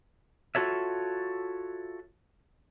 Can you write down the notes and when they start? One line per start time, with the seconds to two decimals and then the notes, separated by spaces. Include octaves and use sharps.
0.55 F4 F#4 A4 C#5 E5